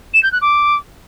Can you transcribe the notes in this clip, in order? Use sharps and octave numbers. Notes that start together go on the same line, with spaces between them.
E7
G6
F#6
D6